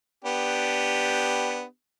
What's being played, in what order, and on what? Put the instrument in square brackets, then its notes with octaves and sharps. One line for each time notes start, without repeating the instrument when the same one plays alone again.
[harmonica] B3 D4 G4